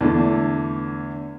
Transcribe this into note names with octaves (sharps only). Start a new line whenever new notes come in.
E2 D3 A3